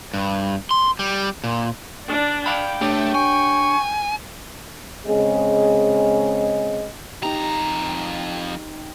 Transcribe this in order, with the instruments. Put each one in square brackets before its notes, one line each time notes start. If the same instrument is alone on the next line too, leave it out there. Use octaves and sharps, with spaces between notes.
[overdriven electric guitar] G2
C6
G3
A#2
[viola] D4 D5
[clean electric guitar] D5 F5 B5 [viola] G5
[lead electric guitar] A3 [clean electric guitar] D4 G4 C#5
[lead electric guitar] G#5 [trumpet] C#6
[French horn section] C#3 G#3 C4 G#4 D#5
[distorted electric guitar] F2 A#5 [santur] D#4 G4